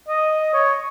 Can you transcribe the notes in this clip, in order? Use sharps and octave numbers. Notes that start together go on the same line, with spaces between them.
D#5
C#5